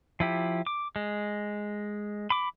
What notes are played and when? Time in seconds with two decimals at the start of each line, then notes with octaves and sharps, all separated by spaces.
0.20 F3 E4 G4
0.67 D6
0.96 G#3
2.30 B5 D6